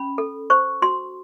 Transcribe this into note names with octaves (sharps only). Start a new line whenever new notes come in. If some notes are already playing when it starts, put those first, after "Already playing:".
Already playing: C#4 B5
A4
C5 C#6
F#4 C6